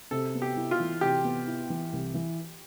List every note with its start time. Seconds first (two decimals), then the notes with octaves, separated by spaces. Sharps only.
0.11 C3 A4
0.35 B3
0.42 G4
0.57 E4
0.71 F4
0.80 E3
1.01 C3 G4
1.24 B3
1.46 E4
1.70 E3
1.93 C2
2.14 E3